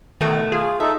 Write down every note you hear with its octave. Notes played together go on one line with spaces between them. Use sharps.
B2 D#3 A3
F4 G#4
D#4 A4 E5